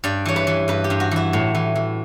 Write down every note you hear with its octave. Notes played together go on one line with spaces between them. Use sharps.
G2 D5
E3 C#5
B4
E3
G2 B4
G4
G2
F#4
E3 E4
A2
E3
E3